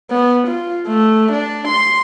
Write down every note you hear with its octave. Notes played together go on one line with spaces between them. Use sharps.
B3
F4
A3
D4
C6